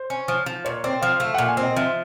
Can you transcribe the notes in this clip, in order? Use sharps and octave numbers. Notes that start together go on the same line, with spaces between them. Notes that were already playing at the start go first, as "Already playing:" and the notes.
Already playing: C5
C#4
F3
F3
A#2 C#5
C4 D5
F3 F5
A3 F5
A#2 F#5
G#5
C4 D#5
F3 E5